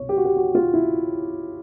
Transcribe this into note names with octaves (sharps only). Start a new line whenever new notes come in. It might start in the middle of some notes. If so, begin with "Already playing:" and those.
Already playing: C2 B2 B3 C#5
G4
F#4
G4
F#4
F4
E4